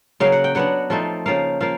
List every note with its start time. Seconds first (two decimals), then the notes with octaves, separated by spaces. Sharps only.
0.20 C#3 F#3 A#3 F5
0.32 F#5
0.44 G5
0.55 F#3 B3 D4 F#5
0.90 F3 A3 C4 D#4
1.26 C#3 F3 A#3 F5
1.60 F3 A#3 F5